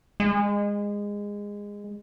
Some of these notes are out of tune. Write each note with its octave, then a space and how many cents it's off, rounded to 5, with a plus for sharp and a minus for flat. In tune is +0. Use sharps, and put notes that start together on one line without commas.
G#3 -20